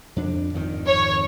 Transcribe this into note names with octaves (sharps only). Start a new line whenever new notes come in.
F2 D4
G#1 F2 D#3
C#5